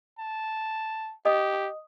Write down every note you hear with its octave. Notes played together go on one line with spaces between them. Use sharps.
A5
G4 D#5 D#6